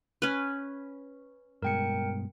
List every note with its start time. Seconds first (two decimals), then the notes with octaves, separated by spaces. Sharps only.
0.22 C#4 B4
1.62 G2 B2 G#3 A#4 G5 C#7